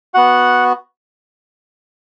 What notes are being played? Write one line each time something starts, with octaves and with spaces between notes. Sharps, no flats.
B3 F#4 F#5